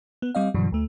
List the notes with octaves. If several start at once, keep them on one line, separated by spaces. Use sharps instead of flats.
B3
G3 C4 D#5 F5
G2 B2 D3 E3 F#3
D2 A3